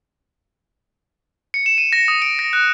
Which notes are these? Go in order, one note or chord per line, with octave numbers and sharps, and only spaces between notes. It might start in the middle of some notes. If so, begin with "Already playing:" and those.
C#7
E7
D#7
A#6
D#6
D7
A#6
F#6